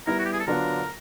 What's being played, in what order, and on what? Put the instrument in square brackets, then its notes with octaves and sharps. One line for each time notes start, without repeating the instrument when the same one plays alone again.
[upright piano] G3 B3 E4 [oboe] A#4
[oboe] F#4
G4
G#4
A4
[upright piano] D3 F#3 B3 D4 F4 [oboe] A#4